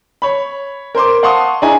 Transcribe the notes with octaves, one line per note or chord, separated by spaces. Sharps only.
C#5 B5
A#4 C5 C6 D6
F5 F#5 A5 C6 C#6 D#6
D4 E4 G#4 D#5 G#5 A#5